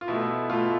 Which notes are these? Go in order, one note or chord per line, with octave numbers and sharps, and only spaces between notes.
F4
B2 A3 E4
B2 A3 F4